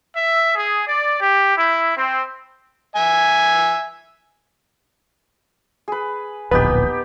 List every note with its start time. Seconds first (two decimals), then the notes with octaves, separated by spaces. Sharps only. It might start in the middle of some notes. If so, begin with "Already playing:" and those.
0.15 E5
0.55 G#4
0.87 D5
1.20 G4
1.57 E4
1.97 C4
2.96 E5 G#5
5.88 G#4 B4
6.51 D1 A#1 A#2 B3 D#4 G4 B4